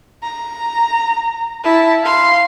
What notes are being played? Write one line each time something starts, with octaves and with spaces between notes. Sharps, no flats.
A#5
E4 A5
F5 C6